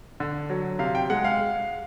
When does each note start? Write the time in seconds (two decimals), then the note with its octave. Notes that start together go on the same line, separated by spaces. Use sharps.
0.20 D3
0.50 F#3
0.79 C3 F5
0.95 G5
1.10 G#3 F#5
1.24 F5